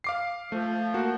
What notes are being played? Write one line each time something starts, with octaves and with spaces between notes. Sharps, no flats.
F5 D6 C7
F3 A3
A#3 F#4